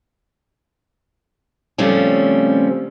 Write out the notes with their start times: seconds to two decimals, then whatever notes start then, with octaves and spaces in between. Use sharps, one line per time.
1.78 C#3 F3 G3 A3 C4 C#4